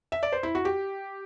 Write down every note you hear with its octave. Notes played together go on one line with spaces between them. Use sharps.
E5
D5
C5
E4
F#4
G4